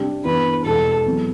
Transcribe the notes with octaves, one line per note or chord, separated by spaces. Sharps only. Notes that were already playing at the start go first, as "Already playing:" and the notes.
Already playing: C3 G3 D4
G2 E3 B3 B4
E1 E2 B2 G3 B3 A4
E2 B2 F#3 C4